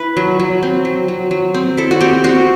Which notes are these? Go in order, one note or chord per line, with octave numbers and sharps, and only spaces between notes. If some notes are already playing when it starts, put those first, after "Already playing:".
Already playing: E4 B4
F#3
F#3
C4
F#3
F#3
F#3
C4
E4 A4
F#4
C4 G4
C4 F#4